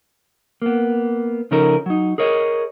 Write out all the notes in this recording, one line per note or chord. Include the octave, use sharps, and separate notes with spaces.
A#3 B3
C#3 F3 C#4 D#4 A4 A#4
F#3 D#4
G#4 A#4 C#5 D#5